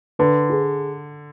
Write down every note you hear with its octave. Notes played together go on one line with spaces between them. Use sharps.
D3 B4
G#4